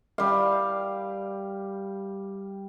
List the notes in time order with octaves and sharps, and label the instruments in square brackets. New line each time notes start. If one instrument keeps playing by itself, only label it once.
[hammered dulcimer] G3 F5